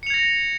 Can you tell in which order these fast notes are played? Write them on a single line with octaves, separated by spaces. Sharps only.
C#7 F7 G#6 A#6